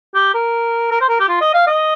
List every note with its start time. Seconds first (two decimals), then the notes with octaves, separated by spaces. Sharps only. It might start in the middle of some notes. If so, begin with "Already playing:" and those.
0.15 G4
0.34 A#4
0.91 A#4
1.01 C5
1.09 A#4
1.20 G4
1.29 F4
1.41 D#5
1.54 F5
1.67 D#5